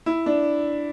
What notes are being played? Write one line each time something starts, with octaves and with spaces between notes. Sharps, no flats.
E4
D4